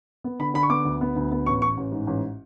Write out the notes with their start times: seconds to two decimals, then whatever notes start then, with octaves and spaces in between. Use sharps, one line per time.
0.24 B3
0.39 D3 B5
0.54 D3 B5
0.63 C#6
0.69 B3 D6
0.85 D2
1.01 B3
1.16 D2
1.32 B3
1.46 A1 C#6
1.61 A1 C#6
1.77 A1
1.92 G#2
2.07 A1